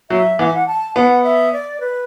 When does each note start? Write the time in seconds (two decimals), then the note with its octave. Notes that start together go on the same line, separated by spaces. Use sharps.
0.10 F#3 E5
0.39 E3 F#5
0.46 E5
0.54 F#5
0.67 A5
0.96 B3 F#5
1.24 E5
1.53 D5
1.81 B4